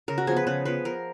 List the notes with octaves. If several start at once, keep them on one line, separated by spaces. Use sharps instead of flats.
C#3 A#4
F#4
F3 B3 G#4
B4
C#3 B4
F3 B3 B4
F3 A#4